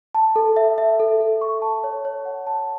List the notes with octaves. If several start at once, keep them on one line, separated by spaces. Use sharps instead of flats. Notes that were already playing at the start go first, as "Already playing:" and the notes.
A5
A4
E5
E5
A4
A4
C#6
A5
C#5
C#5
F#5
A5